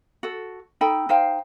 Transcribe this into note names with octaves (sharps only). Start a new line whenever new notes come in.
F#4 A4
D#4 A4 G5 B5
D#4 C5 F5 G5